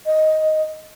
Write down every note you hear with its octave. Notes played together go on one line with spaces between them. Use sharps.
D#5